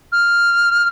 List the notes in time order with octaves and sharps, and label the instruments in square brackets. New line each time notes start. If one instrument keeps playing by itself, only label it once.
[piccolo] F6